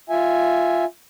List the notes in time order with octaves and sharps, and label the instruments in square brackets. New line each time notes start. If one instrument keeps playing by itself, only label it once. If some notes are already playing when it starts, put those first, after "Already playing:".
[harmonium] F4 E5 G#5